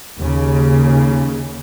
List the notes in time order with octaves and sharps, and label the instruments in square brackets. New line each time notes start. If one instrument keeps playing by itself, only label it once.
[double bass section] D#2 C#3